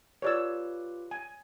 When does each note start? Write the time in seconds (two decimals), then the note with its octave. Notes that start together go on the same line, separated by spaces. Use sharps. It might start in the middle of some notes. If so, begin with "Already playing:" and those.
0.22 F4 G4 B4 C#5 D5 E6
1.11 G#5